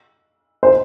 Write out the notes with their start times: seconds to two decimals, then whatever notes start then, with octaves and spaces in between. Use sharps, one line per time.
0.63 C5